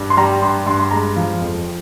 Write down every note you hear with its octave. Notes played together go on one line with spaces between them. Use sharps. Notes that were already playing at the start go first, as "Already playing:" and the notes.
Already playing: G2
C6
G3 A#5
G2 C6
G2 C6
C6
G#3 A#5
F3 F5
F2